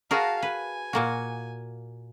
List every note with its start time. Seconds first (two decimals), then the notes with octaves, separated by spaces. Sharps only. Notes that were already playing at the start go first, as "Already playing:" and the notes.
0.11 F#4 G#4 A#4 F5 A5
0.42 B4 G#5
0.93 A#2 A#3 F#4